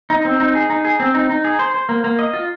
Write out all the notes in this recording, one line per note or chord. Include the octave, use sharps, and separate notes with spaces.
D#4
C4
D#4
G#4
D#4
G#4
C4
D#4
D#4
G#4
C5
C5
A#3
A#3
D#5
F4